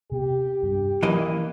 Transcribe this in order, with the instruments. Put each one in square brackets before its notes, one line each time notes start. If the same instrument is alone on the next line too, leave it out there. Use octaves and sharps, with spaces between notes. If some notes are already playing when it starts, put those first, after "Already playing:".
[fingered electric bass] C3 B3 [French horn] G4
[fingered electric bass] G2
[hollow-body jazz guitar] E3 A#3 D#5 [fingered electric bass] F#3 C#4